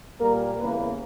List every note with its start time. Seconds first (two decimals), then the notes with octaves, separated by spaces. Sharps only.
0.20 A#2 G3 A#3 A#4
0.59 E2 C#3 E3 A#3 B4